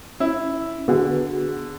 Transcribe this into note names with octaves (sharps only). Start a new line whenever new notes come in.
C#4 E4
D3 B3 F#4 G#4